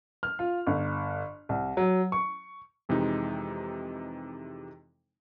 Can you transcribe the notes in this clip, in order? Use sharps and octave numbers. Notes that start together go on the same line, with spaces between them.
F6
F4
G1
C2
F#3
C#6
F2 C3 E3 G#3 D#4